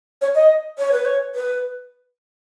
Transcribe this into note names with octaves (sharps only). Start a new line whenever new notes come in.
C#5
D#5
C#5
B4
C#5
B4